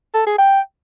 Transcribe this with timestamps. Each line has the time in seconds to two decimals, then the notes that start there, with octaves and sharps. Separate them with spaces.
0.14 A4
0.26 G#4
0.38 G5